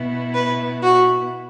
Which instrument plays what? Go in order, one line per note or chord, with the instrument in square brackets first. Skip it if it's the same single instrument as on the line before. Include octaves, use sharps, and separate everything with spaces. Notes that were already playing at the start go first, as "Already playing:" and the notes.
Already playing: [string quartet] B2 B3 E4
B4
F#4